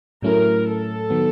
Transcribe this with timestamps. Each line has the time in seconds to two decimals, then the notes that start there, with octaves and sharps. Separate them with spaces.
0.22 A2 F#3 A3 C#4 E4 A#4
0.67 A4
1.10 D#3 F#3 B3